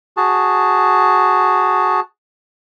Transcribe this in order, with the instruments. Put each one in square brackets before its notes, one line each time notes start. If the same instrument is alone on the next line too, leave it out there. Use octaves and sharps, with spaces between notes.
[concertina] F#4 G#4 A5